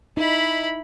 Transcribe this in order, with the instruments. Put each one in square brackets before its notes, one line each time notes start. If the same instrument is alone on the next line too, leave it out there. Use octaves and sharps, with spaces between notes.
[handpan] D#4 [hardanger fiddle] E4 B5